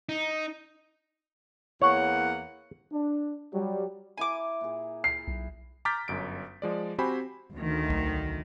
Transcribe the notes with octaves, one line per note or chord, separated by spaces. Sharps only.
D#4
E2 A#3 C#5 F#5
D4
F#3 G3
E4 A#4 G#5 D6
A#2 G#4
C7
B1
A#5 D6 F6 G6 A6 B6
G1 F#2 D7
F3 G#3 D5
C4 F#4 G4 C5 G#5 B5
D2 D#3
B1